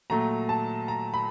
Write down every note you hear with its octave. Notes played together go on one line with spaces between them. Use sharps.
A#2 F#3 A3 A#5
A5
A#5
B5